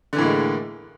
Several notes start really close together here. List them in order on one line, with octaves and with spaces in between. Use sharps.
D3 E3 A2 A#3 G#3